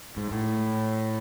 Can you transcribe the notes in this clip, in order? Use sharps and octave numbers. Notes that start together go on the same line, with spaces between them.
G#2
A2